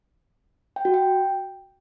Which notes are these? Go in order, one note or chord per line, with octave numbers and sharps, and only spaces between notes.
G5
F#4
G5